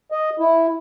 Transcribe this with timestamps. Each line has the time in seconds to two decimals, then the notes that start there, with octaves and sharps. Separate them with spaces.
0.12 D#5
0.40 E4